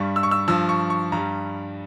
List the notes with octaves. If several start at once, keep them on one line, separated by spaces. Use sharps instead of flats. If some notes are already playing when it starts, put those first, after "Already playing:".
Already playing: G2 G3 C#6
E6
C#6
E6
G2 F3 E6
C#6
C#6
G2 G3 A#5